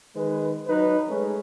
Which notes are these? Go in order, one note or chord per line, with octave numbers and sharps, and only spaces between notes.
D#3 G#3 B4
F#3 D#4 B4
G#3 A3 C#4